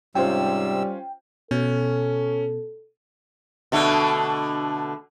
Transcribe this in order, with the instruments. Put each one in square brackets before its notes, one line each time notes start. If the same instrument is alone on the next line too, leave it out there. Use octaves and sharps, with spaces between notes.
[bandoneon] G#2 C3 E6 [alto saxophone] G3 [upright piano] C#4 F4 C5 [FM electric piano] G5
[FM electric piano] B2 [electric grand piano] C#4 [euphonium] A4
[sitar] B2 D3 A3